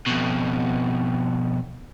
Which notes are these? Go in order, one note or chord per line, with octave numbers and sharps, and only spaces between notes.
F2 B2